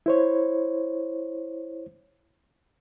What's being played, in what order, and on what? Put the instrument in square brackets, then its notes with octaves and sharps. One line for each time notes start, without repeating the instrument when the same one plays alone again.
[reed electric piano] E4 C5 C#5